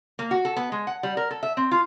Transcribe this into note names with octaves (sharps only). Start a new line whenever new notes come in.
A#3
F#4
A4
B3
G#3
F#5
G3
A#4
A4
E5
C4
F4